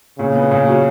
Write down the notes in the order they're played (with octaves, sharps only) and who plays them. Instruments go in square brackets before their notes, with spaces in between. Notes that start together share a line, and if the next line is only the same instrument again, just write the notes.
[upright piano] A#2 [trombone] C#3
[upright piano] B3
A#2
F#3